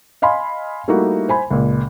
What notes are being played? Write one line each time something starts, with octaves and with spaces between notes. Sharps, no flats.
D#5 F5 G#5 B5 C6
G3 A3 A#3 D#4 E4 F#4
C5 G#5 B5
C#2 A#2